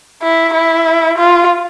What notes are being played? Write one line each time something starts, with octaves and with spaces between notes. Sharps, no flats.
E4
E4
F4